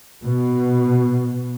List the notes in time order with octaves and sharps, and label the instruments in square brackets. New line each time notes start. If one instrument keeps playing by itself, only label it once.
[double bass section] B2